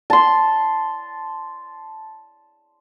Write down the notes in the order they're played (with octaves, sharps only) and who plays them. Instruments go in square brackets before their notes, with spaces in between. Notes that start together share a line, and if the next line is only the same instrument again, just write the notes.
[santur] A5 C6